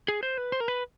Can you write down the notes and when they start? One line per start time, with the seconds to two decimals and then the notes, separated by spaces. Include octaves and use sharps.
0.08 G#4
0.23 C5
0.38 B4
0.52 C5
0.60 A#4
0.68 B4